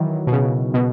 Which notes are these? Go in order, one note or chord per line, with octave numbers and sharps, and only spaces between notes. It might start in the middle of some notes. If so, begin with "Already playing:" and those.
Already playing: D#3 E3 F#3
B2
C#3
B2